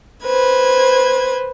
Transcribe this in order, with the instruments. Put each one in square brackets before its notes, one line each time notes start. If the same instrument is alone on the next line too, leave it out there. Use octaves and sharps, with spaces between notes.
[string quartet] B4 C5 G#6